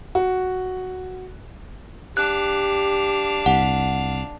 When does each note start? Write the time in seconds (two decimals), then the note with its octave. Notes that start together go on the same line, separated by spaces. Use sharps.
0.15 F#4
2.17 D4 G4 F5 F#6
3.46 C2 F#5